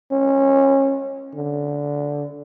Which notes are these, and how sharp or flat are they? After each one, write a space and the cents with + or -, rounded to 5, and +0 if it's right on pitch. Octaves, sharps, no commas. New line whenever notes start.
C#4 -25
D3 -15